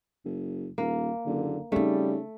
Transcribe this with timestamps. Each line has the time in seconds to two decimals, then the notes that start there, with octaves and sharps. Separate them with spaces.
0.25 F#1
0.78 D#1 A#3
1.26 F#1 D3
1.72 C#3 G3 A3 C4 D#4